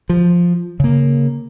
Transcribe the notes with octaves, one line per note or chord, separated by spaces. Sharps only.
F3
C#3 A#3